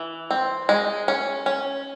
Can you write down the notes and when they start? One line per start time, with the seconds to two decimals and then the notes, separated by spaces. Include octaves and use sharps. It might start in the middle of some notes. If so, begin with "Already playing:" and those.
Already playing: E3
0.31 C4
0.69 G#3
1.08 C#4
1.46 C#4